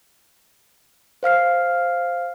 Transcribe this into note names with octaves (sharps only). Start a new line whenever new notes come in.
C5 F5 F6 C7